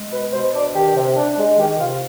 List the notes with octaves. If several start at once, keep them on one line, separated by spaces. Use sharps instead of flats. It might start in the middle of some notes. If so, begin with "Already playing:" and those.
Already playing: G#3
B2 B4
B2 C5
D4 D5
D#3 G4
C3
D4
G#3
D#3 G4
C3 F4